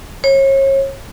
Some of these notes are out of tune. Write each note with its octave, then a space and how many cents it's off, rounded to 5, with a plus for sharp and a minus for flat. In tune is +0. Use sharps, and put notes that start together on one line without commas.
C#5 -35